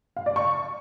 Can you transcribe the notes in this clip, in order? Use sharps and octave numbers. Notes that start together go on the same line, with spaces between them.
F5
D5
C#6